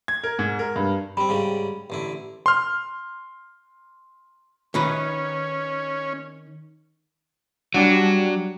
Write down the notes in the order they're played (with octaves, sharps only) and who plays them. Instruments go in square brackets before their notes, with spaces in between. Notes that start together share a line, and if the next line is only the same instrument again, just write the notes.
[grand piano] G#6
A#4
G#2
A#4
G2
[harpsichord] G3 C4 [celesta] B5
[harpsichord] G#2 C#3 G3
A1 D3 E4
[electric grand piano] C6 F6
[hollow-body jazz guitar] D#3 D#4 B4 [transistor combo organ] C#4
[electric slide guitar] F#3 [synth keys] G3 D4 F#5